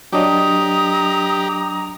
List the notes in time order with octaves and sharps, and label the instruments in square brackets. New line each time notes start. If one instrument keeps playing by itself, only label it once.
[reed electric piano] F#3 D4 D#5 [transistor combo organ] G4 [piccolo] A#5 [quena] D#6